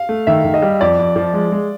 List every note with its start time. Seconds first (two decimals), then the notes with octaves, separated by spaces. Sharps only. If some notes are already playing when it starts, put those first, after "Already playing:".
Already playing: F5
0.09 A3
0.27 D#3 E5
0.44 D#3
0.54 D#5
0.62 G3
0.81 F2 D5
0.99 F2
1.16 F3
1.34 G#3
1.52 G#3